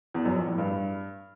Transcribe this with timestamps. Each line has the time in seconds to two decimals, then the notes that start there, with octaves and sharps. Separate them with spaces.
0.14 E2
0.25 F#2
0.36 F2
0.47 A2
0.58 G2